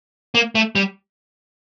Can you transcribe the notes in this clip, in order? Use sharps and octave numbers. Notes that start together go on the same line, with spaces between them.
A#3
A3
G3